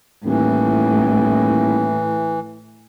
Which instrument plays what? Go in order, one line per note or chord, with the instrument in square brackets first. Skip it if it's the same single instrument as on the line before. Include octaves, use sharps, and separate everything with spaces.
[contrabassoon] D#1 [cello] A2 [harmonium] E3